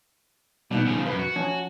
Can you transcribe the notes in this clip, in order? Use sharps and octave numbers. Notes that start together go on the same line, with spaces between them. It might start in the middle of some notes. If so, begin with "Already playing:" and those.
B2 G3 B3 D#4
C#3 F3
F#2 B4
F#4
F3 C#4 G#5